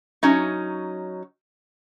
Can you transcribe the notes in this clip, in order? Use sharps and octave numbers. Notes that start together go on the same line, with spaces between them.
F#3 C#4 D#4